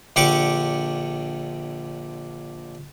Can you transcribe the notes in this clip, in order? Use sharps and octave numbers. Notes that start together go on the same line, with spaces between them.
A#1 D3 G4 F#5 C#6 D6